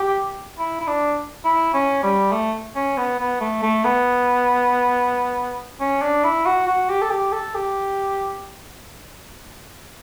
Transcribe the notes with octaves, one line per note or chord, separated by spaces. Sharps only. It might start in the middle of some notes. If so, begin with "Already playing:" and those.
Already playing: G4
E4
E4
D4
E4
C#4
G3
A3
C#4
B3
B3
A3
A3
B3
C#4
D4
E4
F#4
F#4
G4
A4
G4
A4
G4